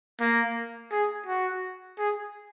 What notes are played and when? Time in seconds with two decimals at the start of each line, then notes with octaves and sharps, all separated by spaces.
0.20 A#3
0.92 G#4
1.26 F#4
1.98 G#4